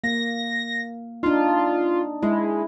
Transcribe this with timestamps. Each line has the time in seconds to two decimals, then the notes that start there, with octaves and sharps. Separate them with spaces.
0.04 A#3 A#6
1.23 D4 D#4 F4
2.23 G#3 E4